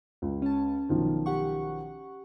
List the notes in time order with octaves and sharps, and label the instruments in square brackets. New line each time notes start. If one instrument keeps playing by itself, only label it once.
[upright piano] C#2
[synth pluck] C#4 A5
[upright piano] B1 D#3 F3
[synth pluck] G4 F#5 C#6